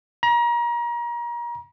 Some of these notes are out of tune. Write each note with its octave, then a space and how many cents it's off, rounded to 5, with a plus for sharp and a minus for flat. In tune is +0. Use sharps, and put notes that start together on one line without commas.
A#5 +30